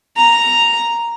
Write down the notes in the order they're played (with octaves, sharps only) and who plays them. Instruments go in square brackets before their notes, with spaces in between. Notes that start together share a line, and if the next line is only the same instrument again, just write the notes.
[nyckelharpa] A#5